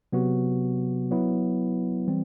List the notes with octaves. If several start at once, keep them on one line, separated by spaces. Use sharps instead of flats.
C3 F#3 B3 F#4
F#3 B3 E4
E3 G3 C4